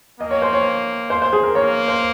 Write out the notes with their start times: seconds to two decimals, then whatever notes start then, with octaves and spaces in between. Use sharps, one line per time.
0.20 A#3 D#5
0.31 C#5
0.42 C5
0.53 C#5
1.10 C5
1.22 C5
1.33 G#4
1.43 A#4
1.55 A#3 C#5
1.88 C5